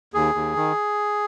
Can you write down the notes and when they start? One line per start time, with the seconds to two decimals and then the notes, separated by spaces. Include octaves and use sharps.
0.14 D#2 G#4
0.35 D#2
0.56 D#3